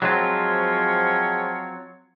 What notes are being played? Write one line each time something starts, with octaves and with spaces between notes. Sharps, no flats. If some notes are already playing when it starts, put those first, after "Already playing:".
F3 F#3 G#3 C4 F4 C#5